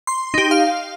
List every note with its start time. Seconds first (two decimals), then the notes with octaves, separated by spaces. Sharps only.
0.07 C6
0.34 D#4 G4
0.51 F5